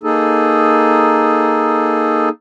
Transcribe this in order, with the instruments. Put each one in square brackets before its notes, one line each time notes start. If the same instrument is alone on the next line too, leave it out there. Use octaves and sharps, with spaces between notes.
[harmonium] A#3 D#4 G#4 A4